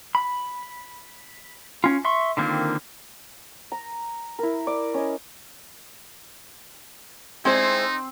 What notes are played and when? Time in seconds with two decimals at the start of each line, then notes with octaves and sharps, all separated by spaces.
0.15 B5
1.84 C#4 F4
2.05 E5 C6 C#6
2.37 D3 D#3 A#3 C4 F4
3.72 A#5
4.39 E4 A#4
4.67 D5
4.94 C#4 D#5
7.45 G#3 C4 D#4 E4 C5